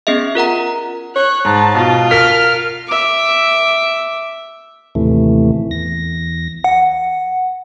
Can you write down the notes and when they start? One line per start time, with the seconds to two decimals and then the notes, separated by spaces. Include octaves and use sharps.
0.07 B3 C#4 G#4 D#5 E5
0.35 F4 A#4 F#5 A#5
1.16 C#5 F#6
1.45 G#2 A5
1.75 B2 F4
2.11 A#4 F6 B6
2.87 E5 D6
4.95 D#2 A2 C3 E3 A3
5.71 E2 A#6
6.64 F#5